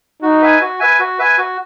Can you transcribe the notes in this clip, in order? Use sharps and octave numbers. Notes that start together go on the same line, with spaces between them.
D#4 F#4
B4 E5 G#5
F#4
B4 E5 G#5
F#4
B4 E5 G#5
F#4